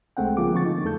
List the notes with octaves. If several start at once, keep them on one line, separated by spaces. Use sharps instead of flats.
C2 G#3 A3 C4 F#5 G5
C#3 F3 A#3 F4 G#4 D6
D3 F3 C4 C#6 A6
D#4
E2 A3 A4 G6